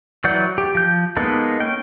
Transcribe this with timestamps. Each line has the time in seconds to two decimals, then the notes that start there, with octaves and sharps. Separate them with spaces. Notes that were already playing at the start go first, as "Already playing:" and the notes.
0.24 E3 F#3 D5 F#5 G6
0.58 G4
0.75 F3 G6
1.17 G#3 A#3 B3 D#4 A4
1.60 C#4 G5